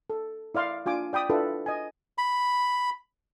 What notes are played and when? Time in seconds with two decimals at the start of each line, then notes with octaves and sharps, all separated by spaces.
0.10 A4
0.55 E4 D5 F5 C6
0.86 D4 F4 G#5 D6
1.13 D5 G5 B5 D#6
1.29 D4 E4 F4 A4 B4
1.66 D#5 G#5
2.18 B5